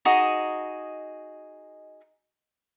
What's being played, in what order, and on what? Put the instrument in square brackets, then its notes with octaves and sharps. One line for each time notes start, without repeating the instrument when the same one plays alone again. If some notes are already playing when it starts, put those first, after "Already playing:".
[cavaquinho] D#4 F#4 G#4 D#5